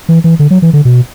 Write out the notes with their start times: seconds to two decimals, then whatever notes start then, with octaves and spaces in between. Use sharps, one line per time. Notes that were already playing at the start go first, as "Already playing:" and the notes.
0.09 E3
0.24 E3
0.39 D3
0.50 F#3
0.62 E3
0.73 D3
0.85 B2